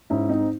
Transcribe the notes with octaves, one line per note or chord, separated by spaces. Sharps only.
G#2 C#4 E4
C4 D#4